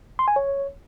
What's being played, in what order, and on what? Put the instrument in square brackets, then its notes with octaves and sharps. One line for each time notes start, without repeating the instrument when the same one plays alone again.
[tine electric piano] C6
G#5
C#5